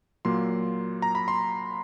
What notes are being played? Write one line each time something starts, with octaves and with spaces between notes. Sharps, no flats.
A#2 F#3 A#3 C6
A#5
B5
C6